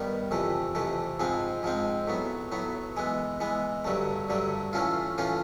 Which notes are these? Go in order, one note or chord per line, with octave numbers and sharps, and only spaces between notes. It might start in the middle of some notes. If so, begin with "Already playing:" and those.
Already playing: G2 D#3 G3 B3
F2 C3 E3 A3
F2 C3 E3 A3
G#2 F3 G#3 C4
G#2 F3 G#3 C4
A2 F#3 B3
A2 F#3 B3
E3 G#3 B3
E3 G#3 B3
G2 D3 F#3 A3
G2 D3 F#3 A3
A2 E3 A3 C#4 F4
A2 E3 A3 C#4 F4